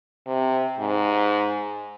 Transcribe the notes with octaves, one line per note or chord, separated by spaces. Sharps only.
C3
G#2